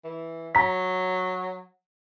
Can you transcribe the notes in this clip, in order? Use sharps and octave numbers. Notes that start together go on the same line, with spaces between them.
E3
F#3 A#5 B6